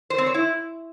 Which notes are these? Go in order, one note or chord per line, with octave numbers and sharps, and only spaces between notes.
C5
C4
C#5
E4